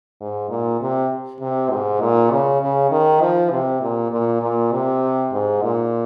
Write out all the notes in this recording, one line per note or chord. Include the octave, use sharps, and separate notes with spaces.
G#2
A#2
C3
C3
G#2
A#2
C#3
C#3
D#3
F3
C3
A#2
A#2
A#2
C3
G#2
A#2